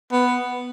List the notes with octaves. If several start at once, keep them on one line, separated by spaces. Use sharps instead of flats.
B3